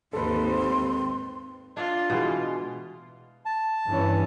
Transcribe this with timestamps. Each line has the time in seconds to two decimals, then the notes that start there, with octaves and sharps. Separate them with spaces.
0.13 D#2 G#2 C4 A4 B4 C6
1.77 D4 F4
2.10 B2 E3 G#3
3.45 A5
3.87 G2 E3 C#4